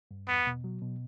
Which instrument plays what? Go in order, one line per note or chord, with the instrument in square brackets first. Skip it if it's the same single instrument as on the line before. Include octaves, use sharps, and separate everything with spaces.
[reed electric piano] G2
[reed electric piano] E2 [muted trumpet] B3
[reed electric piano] B2
F#3
B2